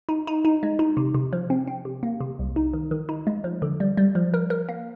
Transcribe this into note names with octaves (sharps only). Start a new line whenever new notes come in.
D#4
D#4
D#4
G#3
D#4
C3
C3
F3
C4
C4
C3
A#3
C3
C2
D#4
D#3
D#3
D#4
G#3
F3
D3
G3
G3
F3
A#4
A#4
A#3